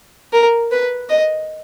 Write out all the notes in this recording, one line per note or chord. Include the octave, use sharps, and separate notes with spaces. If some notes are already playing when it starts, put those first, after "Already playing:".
A#4
B4
D#5